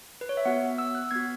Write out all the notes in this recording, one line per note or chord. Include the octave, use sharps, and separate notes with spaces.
B4
C#5
E5
B3 F#4 F#5
E6
F#6
B3 F#4 G#6